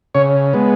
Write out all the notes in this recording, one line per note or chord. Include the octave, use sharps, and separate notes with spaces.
C#3 C#5
G#3 B3